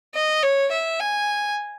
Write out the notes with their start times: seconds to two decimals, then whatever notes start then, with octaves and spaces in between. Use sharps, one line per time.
0.14 D#5
0.43 C#5
0.71 E5
1.00 G#5